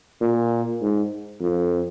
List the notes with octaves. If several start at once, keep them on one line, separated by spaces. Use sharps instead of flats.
A#2
G#2
F2